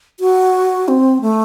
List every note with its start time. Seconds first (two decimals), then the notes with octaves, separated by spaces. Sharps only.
0.20 F#4
0.88 C4
1.21 A3